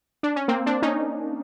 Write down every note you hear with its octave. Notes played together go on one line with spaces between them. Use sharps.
D4
C#4
A#3 C4
C4 D4
C#4 D#4